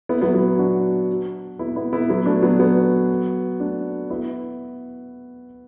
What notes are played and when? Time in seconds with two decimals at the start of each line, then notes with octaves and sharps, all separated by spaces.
0.09 B3 E4
0.21 F#3 B3
0.34 F#3 B3
0.59 D4 F#4
1.59 B3 E4
1.76 B3 E4
1.93 B3 E4
2.09 F#3 B3
2.26 A3 D4
2.42 F#3 B3
2.59 F#3 B3
3.60 A3 D4
4.10 B3 E4